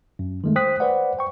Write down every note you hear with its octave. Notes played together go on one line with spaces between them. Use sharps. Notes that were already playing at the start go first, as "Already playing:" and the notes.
F#2
D#3 G#3 A3
C5 G5 D#6 F#6 B6
B4 C5 D5 F#5
C5 G5 C#6